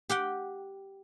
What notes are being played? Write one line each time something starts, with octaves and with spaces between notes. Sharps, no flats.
G4 F#5 G5